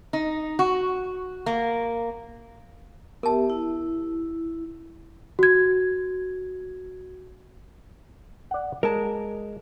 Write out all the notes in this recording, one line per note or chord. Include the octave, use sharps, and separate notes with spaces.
D#4
F#4
A#3
B3 G4 A#4 E5 A5
E4
F#4 G#6
D5 F#5
G#3 A#4 A5